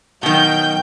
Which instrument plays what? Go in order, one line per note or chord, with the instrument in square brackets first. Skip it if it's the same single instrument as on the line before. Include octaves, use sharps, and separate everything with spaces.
[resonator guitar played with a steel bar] B2 D#3 [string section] F#3 G5 G6